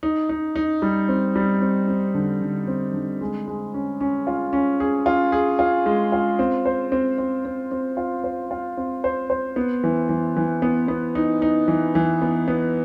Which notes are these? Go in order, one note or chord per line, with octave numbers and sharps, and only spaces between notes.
D#4
D#4
D#4
G3
C4
G3
C4
C4
D3
D3
C4
D3
G#3
G#3
C#4
C#4
F4
C#4
G#4
F4
G#4
F4
G#3
F4
C4
C5
C4
C4
C4
C4
F4
C5
F4
C4
C5
C5
B3
E3
E3
E3
B3
B3
D#4
D#4
E3
E3
B3
B3